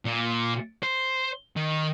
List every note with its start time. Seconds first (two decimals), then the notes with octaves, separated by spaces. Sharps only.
0.05 A#2
0.83 C5
1.56 D#3